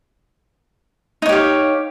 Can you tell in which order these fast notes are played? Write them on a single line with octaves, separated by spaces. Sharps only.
D#4 C#5 G4 F5